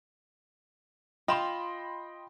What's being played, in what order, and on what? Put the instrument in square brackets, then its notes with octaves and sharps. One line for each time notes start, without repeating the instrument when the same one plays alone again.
[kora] F4 [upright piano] D#5 C6 [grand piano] G5 B5 E7